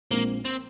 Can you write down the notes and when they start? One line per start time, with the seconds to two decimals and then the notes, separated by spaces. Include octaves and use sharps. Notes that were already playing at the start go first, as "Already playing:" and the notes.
0.11 A#1 A#2 G#3 A#3 C4
0.45 C4